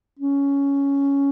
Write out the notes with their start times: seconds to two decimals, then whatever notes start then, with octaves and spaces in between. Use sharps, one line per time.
0.19 C#4